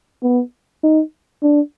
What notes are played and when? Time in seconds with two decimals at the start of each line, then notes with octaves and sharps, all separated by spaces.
0.23 B3
0.83 D#4
1.43 D4